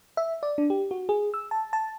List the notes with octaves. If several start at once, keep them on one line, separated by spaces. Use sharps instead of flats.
E5
D5
D4
G4
F#4
G#4
E6
A5
A5